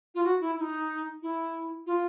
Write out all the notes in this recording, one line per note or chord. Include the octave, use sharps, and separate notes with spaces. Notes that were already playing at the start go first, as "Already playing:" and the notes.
F4
F#4
E4
E4
D#4
E4
F4